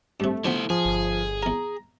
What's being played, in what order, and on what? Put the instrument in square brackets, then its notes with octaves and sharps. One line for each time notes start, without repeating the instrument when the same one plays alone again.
[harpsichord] G2 C3 [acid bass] A3
[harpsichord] D3 F3 B3 [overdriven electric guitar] E4 C5
[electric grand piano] F3 [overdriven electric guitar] G#4 [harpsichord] D6
[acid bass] G1
[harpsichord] E2 A#4 [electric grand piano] A#5